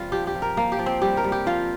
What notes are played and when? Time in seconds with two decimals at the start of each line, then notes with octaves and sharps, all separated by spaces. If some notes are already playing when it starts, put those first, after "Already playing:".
Already playing: C3 G3 C4 F4
0.12 F3 G4
0.27 G4
0.35 F3
0.42 A#4
0.57 F3 A#3
0.72 G4
0.79 F3
0.86 C4
1.02 G3 G4
1.17 A#4
1.24 G3
1.32 G4
1.46 F3 F4